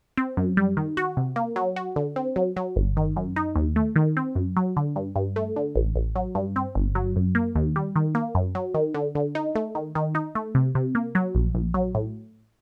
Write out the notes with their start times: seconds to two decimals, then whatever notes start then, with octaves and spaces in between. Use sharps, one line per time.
0.17 C4
0.37 F#2
0.57 G3
0.77 D#3
0.97 F#4
1.17 C3
1.36 A#3
1.56 F#3
1.76 F#4
1.96 D3
2.16 C4
2.36 F#3
2.56 F#3
2.76 G1
2.97 D#3
3.16 F#2
3.36 D#4
3.56 D#2
3.76 A3
3.96 D#3
4.17 C4
4.36 F#2
4.57 F#3
4.77 D3
4.96 G2
5.15 G2
5.36 A3
5.56 D3
5.75 A1
5.96 A1
6.16 F#3
6.35 G2
6.56 C4
6.75 G1
6.95 F#3
7.16 F#2
7.35 A#3
7.55 D#2
7.76 G3
7.96 D#3
8.15 A#3
8.35 F#2
8.55 F#3
8.74 D#3
8.94 D3
9.15 D3
9.35 D#4
9.55 A3
9.75 D#3
9.95 D#3
10.15 D#4
10.35 A3
10.55 C3
10.75 C3
10.95 A#3
11.15 F#3
11.35 A#1
11.55 A#1
11.74 F#3
11.95 A2